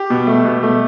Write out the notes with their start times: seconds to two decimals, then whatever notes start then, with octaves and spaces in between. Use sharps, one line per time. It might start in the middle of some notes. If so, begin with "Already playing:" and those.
Already playing: G4
0.10 B2
0.27 A3
0.45 B2
0.63 A3